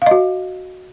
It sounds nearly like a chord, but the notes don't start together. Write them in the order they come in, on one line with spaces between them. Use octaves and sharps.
F5 D#5 F#4